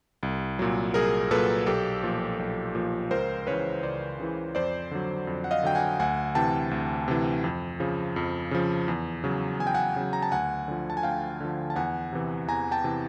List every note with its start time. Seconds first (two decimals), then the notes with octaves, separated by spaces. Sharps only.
0.23 C2
0.59 A#2 F#3
0.94 C2 G#4 A#4
1.31 A#2 F#3 A4 B4
1.66 B1 G4 A4
2.03 A#2 F3
2.39 B1
2.75 A#2 F3
3.11 C#2 A#4 C5
3.47 C#3 E3 B4 C#5
3.83 C#2 C5 D5
4.20 C#3 E3
4.55 F2 C5 D5
4.91 D3 F#3
5.27 F2
5.44 F#5
5.51 D#5 F5
5.63 D3 F#3 G5
5.75 F#5 G#5
6.00 D2 F#5 G#5
6.35 C3 E3 G5 A5
6.71 D2
7.08 C3 E3
7.44 F2
7.80 C#3 F3
8.16 F2
8.51 C#3 F3
8.88 E2
9.24 C#3 F#3
9.59 E2 G#5
9.67 G5
9.75 F#5 G#5
9.96 C#3 F#3
10.13 A#5
10.23 A5
10.32 D2 F#5 G#5
10.68 D3 F3
10.90 A5
10.97 G#5
11.03 D2 F5 G5
11.40 D3 F3
11.70 A5
11.76 E2 F#5 G#5
12.13 C3 E3
12.48 E2 G#5 A#5
12.71 G5 A5
12.84 C3 E3